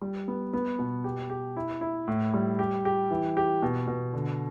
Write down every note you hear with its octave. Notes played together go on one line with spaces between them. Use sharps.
G3
B3
B3
B2
G4
G4
E4
E4
A2
G3
G4
G4
E3
G4
B2
B2
D3